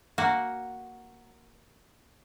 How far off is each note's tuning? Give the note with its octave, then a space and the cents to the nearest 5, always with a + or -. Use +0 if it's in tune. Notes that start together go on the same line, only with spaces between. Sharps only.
A#3 +0 F#4 +0